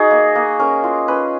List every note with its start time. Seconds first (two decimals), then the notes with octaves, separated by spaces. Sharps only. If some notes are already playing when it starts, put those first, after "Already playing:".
Already playing: D#4 F#4 G#4 D#5
0.11 A#3
0.35 A#3
0.59 C#4 A#4
0.84 F4
1.08 C#4 B4